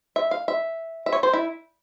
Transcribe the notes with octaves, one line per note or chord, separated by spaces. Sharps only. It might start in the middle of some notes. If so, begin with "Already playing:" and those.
E5
F5
E5
E5
C#5
C5
E4